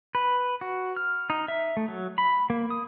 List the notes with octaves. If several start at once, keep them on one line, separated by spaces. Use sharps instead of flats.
B4
F#4
F6
D#4
E5
A3
F#3
B5
A#3
D#6